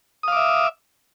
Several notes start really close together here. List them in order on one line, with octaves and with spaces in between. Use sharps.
D#6 F5 D6 E5